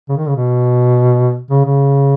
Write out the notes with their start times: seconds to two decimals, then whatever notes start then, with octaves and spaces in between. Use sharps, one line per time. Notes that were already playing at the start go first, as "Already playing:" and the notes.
0.09 C#3
0.17 D#3
0.28 C#3
0.36 B2
1.50 C#3
1.65 C#3